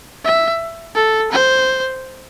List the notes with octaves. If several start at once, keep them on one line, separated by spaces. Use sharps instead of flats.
E5
A4
C5